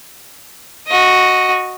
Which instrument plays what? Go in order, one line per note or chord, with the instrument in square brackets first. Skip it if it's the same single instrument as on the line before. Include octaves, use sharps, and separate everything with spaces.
[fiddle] F#4 D#5